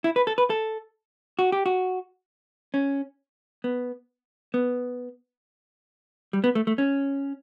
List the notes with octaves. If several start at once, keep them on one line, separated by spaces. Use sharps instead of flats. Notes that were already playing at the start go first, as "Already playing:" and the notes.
E4
B4
A4
B4
A4
F#4
G4
F#4
C#4
B3
B3
G3
B3
A3
A3
C#4